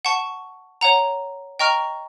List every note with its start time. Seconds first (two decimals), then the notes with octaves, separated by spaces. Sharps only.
0.05 F#5 A5 C#6
0.81 C#5 F#5 A#5
1.59 D#5 G5 A#5 C#6 F6